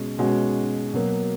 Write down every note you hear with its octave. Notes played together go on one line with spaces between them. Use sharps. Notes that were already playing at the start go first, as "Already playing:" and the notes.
Already playing: B2 G#3 C#4
B2 G#3 C#4 F#4
B2 F#3 A#3